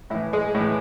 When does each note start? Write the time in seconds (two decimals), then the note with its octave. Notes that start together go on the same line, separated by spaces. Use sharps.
0.10 A2 E3 E4
0.33 G#3 G#4
0.55 A2 E3